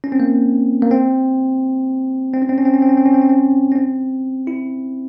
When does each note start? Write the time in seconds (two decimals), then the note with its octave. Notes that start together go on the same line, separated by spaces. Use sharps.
0.04 C#4
0.12 C4
0.20 A#3
0.82 A#3
0.91 C4
2.33 C4
2.42 C#4
2.49 C4
2.58 C#4
2.65 C4
2.74 C#4
2.82 C4
2.89 C#4
2.97 C4
3.06 C#4
3.14 C4
3.22 C#4
3.29 C4
3.72 C#4
3.76 C4
4.47 E4